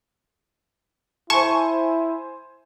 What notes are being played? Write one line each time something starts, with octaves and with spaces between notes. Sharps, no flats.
E4 C5 G#5 A5 C#6